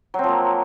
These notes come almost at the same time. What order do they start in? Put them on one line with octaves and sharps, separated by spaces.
F#3 C4 F3 A#3